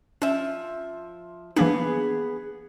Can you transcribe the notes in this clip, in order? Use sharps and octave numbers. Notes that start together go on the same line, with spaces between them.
F3 C#4 E5
E3 A#3 B3 D4 G#4